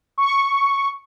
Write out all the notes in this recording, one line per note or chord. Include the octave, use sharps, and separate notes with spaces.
C#6